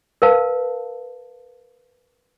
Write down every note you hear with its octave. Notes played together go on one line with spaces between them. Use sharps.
A#4 B4 F5 A5